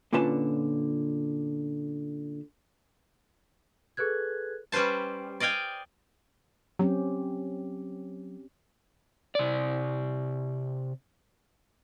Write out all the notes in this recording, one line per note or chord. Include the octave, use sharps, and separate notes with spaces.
A#2 D3 C#4 F4 B4 A5
G#4 A4 B4 F#6 G#6
G3 C#4 B4 C5 A5
D5 D#5 F5 G5 G#5
F#3 C4 C#4 G4
C3 D5